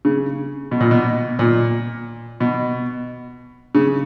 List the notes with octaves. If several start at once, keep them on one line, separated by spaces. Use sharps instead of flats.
C#3
B2
A#2
B2
A#2
B2
C#3